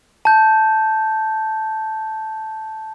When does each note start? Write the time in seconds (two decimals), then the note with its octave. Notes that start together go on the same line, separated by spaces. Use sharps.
0.25 A5 G6